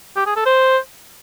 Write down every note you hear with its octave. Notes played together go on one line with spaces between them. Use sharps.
G4
G#4
A4
C5